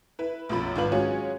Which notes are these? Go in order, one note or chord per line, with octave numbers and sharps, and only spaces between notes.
E4 B4
B1 F#2 F3 B5 A6
G#1 D4 F4 B4 F#7
F#3 G#3 C#4 F4 F#4 G#4